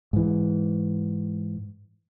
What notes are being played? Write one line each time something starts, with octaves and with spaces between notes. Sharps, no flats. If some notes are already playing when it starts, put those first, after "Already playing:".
G#2 E3